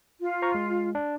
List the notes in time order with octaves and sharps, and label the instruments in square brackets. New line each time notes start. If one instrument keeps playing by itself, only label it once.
[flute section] F4
[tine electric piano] C5 A#5 C#6
G#3
D4